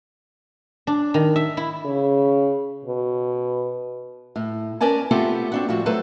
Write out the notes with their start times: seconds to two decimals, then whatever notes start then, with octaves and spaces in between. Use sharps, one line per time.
0.87 D4
1.14 D#3
1.36 E5
1.57 E4
1.85 C#3
2.85 B2
4.36 A2
4.81 C#4 A#4 B4 D5 G#5 A5
5.11 A3 B3 C4 F4 G4 A4
5.52 C4 D4 F#4
5.68 A2 F3 G3 F#4
5.86 F#3 A3 A4 B4 C5